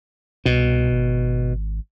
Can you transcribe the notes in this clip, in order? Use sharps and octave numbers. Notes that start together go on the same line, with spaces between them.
C2 B2
G#1